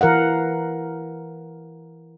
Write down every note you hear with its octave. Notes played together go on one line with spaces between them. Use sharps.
E3 A#4 F5 F#5